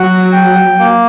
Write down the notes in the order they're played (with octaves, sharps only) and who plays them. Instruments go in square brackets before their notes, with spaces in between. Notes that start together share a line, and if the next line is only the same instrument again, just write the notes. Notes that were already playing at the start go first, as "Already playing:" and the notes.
Already playing: [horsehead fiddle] F#3 [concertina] F#4 F#5
[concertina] G5
A#3